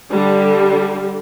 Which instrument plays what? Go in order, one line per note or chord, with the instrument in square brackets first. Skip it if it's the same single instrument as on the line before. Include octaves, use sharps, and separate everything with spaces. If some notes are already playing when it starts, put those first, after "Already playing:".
[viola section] D3 G3